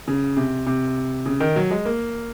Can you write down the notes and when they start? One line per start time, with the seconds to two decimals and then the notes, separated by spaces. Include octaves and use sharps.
0.08 C#3
0.37 C3
0.67 C3
1.26 C#3
1.40 D#3
1.56 F#3
1.71 G#3
1.85 A#3